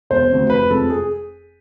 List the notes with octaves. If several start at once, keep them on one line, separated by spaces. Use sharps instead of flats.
E1 C5
D2 C3
F1 B4
F2 C3 G#3 A4
G#4